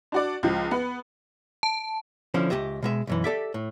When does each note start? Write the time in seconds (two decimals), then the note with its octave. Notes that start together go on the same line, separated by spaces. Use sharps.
0.12 D4 F#4 D5
0.43 C#2 F3
0.71 B3 F#5
1.63 A5
2.34 D3 F3 C#4 E4
2.50 C#2 F#2 G4 D#5 E5
2.82 B2 G#3 E5
3.07 B1 F#2 E3
3.24 G4 A4 D5 E5
3.54 A2